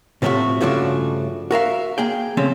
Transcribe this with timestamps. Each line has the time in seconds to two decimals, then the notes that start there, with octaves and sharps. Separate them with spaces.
0.22 A2 C3 F3 G3 A3 F#4
0.60 G2 C#3 F3 A3 D4 F#4
1.51 F#4 A#4 E5 F5
1.98 A#3 G#4 G5
2.37 C#3 F3 A3 C4 C#4